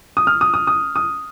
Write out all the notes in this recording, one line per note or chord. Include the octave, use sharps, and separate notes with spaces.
D#6
F6
D#6
D#6
D#6
D#6